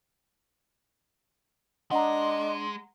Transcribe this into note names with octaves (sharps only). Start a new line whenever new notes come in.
G#3 D4 D#5 F#5 A#5